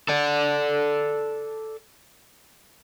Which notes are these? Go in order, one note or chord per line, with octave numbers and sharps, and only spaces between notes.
A4 D5